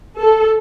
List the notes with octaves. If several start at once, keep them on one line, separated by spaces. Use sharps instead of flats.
A4